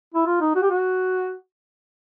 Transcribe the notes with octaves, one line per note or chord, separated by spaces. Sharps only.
E4
F4
D#4
F#4
G4
F#4